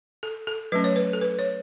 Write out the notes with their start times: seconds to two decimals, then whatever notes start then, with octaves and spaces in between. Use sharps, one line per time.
0.23 A4
0.47 A4
0.72 F#3 A3 C#4 B4
0.84 C#5
0.96 B4
1.13 A4
1.21 B4
1.39 C#5